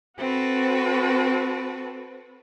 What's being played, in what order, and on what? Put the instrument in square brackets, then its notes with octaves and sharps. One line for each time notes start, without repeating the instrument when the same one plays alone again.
[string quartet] C4 F#4 A4 B4